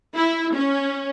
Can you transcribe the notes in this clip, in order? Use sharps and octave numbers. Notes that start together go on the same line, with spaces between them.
E4
C#4